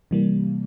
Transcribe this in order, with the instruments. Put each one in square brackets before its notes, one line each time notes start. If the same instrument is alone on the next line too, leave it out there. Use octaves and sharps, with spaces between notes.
[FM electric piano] C3 E3 G3 A#3